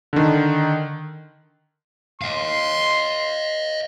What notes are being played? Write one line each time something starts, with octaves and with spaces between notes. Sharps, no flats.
D3 D#3
D#5 F5 C6